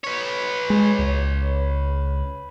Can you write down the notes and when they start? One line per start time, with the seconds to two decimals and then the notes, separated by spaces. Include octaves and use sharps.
0.04 B4 C#5
0.70 G#3
0.99 C#2